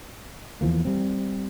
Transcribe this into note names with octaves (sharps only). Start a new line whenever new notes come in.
E2 E3 F3 A#3
G3 C4